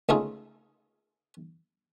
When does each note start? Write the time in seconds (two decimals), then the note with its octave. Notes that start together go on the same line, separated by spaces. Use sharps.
0.09 C#2 A3 D#4 F4 G#4